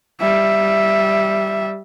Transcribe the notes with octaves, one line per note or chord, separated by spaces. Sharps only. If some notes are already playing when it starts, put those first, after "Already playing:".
G3 E5